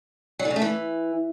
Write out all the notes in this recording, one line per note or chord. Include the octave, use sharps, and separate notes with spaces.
F#3
D3
C#3
A3
E3